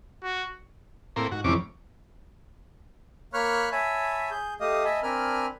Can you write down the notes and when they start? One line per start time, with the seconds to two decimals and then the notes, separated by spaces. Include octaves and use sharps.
0.23 F#4
1.16 A2 A#3 C4
1.31 G#2 F#4
1.44 F2 A2 C3 F3 C#4 D6
3.34 A#3 C#5 B5 C#6 F6 F#6
3.72 C#5 E5 G#5 A5 B5
4.31 G#4 G6
4.60 A3 G4 D#5 F5 D#6
4.85 D#5 E5 G#5 A5 B5
5.03 C4 D4 A#4 G#5 B5 F6